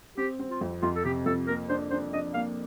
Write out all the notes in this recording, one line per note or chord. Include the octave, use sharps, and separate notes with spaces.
C4 G4
C4
F4
F2
F2 F4
A4
C3 G4
F2 A4
A#3 A#4
D4 C5
D4 C5
D4 D#5
A#3 F5